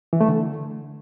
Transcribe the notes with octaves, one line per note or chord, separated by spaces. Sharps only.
E3
A3
D3